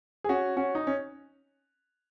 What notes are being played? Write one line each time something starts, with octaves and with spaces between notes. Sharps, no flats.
G#4
C#4 F#4
C#4 F#4
D#4
C#4